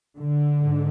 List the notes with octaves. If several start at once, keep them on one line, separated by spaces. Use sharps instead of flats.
D3
G#2